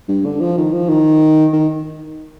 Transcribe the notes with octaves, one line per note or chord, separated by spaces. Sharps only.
G2
D3
F3
D#3
F3
D#3
D#3